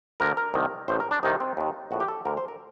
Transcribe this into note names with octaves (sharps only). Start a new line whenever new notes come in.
D2 D3 A#4
A#4
C2 C3 D#3
A1 A2 C5
A#4
D4
C2 C3 D#3 D#4
C4
D#2 D#3
A#1 A2 F#4
G4
A4
D2 D3 A#4
C5
A#4